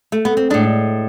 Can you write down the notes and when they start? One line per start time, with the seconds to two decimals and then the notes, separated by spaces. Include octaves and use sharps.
0.12 A3
0.25 B3
0.37 C4
0.50 A2 G#3 D4